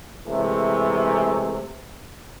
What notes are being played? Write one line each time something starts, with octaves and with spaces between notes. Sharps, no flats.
C3 E3 G#3 A3